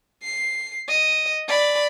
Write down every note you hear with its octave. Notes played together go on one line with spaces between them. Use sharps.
C7
D#5
D5 B5